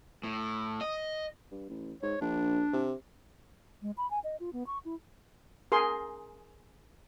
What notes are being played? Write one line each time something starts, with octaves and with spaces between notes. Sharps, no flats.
A2
D#5
G2
A1
G#2 C#5
A#1 D4
C3
G#3
B5
G#5
D#5
F4
B3
C#6
E4
G#4 A#4 C6